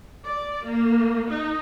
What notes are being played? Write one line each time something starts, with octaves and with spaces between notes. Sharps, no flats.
D5
A#3
D#4